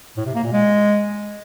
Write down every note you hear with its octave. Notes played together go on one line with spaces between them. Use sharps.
A2
C3
A#3
A#2
G#3